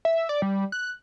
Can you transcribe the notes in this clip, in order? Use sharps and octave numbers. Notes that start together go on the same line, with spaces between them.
E5
D5
G3
F#6